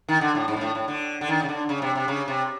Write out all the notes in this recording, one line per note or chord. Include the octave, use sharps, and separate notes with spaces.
D#3
D3
A2
G#2
A#2
A2
A2
D3
D3
D#3
C#3
D3
C#3
C3
C3
C#3
C3